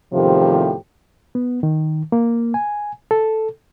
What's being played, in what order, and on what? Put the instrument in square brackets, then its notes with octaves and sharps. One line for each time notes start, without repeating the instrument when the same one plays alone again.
[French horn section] E2 A2 C3 D#3 F3 G4
[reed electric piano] B3
D#3
A#3
G#5
A4